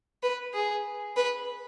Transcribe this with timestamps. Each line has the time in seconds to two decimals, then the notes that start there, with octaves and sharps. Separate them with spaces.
0.23 B4
0.54 G#4
1.16 B4